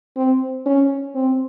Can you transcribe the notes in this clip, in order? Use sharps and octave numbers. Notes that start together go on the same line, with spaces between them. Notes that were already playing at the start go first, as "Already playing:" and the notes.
C4
C#4
C4